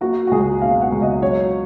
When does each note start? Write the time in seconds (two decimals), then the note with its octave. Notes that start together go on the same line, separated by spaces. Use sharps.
0.01 A#3 F#4
0.27 F#4
0.31 C#2 G#4
0.62 B2 F5
0.81 F#5
0.92 C#2
1.02 D#5
1.22 F#3 C#5